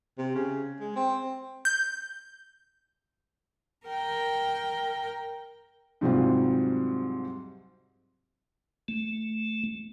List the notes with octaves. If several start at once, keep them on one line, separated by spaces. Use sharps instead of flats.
C3
C#3
G#3
C4
G6
A#4 G5
G#2 C3 F#3 G3 C4 F4
A3